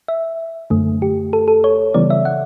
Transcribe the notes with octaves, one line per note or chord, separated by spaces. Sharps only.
E5
F#2 D3 A3
G4
A4
A4
C#5
C#3 E3 G3 B3 D5
E5
F#5